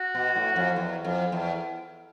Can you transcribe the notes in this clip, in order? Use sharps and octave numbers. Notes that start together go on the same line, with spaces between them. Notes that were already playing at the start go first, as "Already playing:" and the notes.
Already playing: F#4
B2
A2
F2
E2
F2
E2